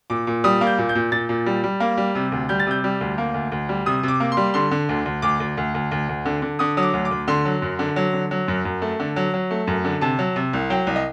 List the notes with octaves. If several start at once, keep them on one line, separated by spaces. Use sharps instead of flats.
A#2 D6
A#2
G3 D#6
A#3
G6
A#2
G6
A#2
A#2 A6
A#2
G3
G3
A#3
G3
C3
D2
G3 G6
A6
C3 G6
G3
D2
A#3
D2
D2
G3
C3 D#6
C3 D6
A#3
C6
G3
D3 C6
D3
D2
D2
D2 D6
D2
D2
D2
D2
D2
D3
D3
D3 D#6
F#3 D#6
D6
D2
D6
D2
D3 C6
F#3
F#2
D3
F#3
D3
F#3
F#2
F#2
A3
D3
F#3
F#3
A3
F#2
D3
C3 A5
F#3
C3
C2
F#3 G5
C2
D#5